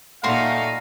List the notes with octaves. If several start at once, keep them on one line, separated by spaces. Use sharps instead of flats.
A#2 A3 D#4 F#4 F5 C6